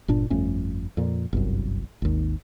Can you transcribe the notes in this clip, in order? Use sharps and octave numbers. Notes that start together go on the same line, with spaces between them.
G1 A#2 D4
G1 F2 A3 C#4
F2 A#2
G1 C2 F#2
G#1 D#2